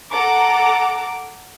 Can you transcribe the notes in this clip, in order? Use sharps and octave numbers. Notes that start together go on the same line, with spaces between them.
A4 F#5 A#5 D6